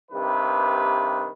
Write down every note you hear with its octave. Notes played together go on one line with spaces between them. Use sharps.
G2 C3 D#3 B4